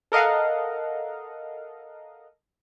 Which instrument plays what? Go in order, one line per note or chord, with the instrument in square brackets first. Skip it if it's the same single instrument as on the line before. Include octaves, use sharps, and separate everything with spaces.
[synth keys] A4 A#4 D#5 F5 F#5